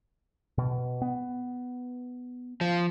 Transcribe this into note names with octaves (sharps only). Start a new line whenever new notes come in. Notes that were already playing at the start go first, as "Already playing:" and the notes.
B2
B3
F3